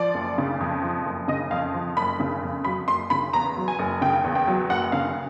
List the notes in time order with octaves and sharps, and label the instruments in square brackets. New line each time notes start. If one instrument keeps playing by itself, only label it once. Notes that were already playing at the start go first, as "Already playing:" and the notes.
Already playing: [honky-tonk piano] F3 D5
F#1
C#3
F2
F3
F#1
C#3 D#5
F2 F5
F3
F#1 B5
C#3
F2
F#3 B5
F#1 C6
C#3 B5
E2 A#5
F#3
G#5
F#1
C#3 G5
E2
G5
F#3
F#1 F#5
C#3 F5